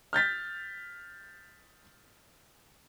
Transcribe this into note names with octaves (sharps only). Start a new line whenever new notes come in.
F6 G6 A6 B6